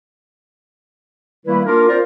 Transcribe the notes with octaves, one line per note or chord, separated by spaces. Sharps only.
D#3 G3 A3 A#3 E4 B4
A#3 D4 F4 A#4
C4 F4 A#4 C5 D5